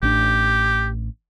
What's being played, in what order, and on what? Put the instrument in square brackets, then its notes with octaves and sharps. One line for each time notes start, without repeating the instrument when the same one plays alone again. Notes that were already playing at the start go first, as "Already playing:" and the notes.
[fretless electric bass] A1 D4 [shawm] G4